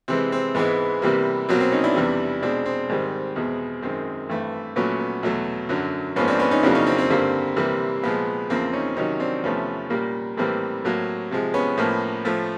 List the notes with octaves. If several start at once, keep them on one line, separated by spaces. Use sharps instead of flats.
C3 E3 G#3 C4
C4
G#2 E3 G#3 B3
C3 E3 G3 A#3
B2 F#3 A#3 C4
C4
C#4 D#4
D4 E4
E2 C3 E3 G3
B2 G#3 C4 D4
C4
G#2 D#3 G3
E2 B2 G#3
F#2 D#3 G#3 C4
G2 E3 A3
A#2 F#3 A3 B3 C#4
B3
E2 B2 F#3 A3
F#2 D3 F#3
G#2 F3 A#3 B3 C#4
C4 D4
B3 C#4
C#4 D#4
F2 C#3 F#3 A#3 D4 E4
C#4 D#4
C4
C4
G2 D3 G3 A#3 C4
C3 E3 G3 A#3
A#2 F3 G#3 B3
E2 C#3 F3 A#3 C4
C#4 D#4
C3 D#3 F#3 C#4 D#4
C4 D4
E2 C3 F3 A3 B3 C#4
A#2 G3 A#3
A2 E3 G3 A#3 C4
A2 F#3 A#3
C3 F3 G#3
B3 C#4
A2 F3 A#3
A2 F3 A3